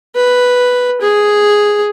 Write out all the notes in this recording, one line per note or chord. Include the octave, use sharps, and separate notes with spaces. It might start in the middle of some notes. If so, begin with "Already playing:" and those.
B4
G#4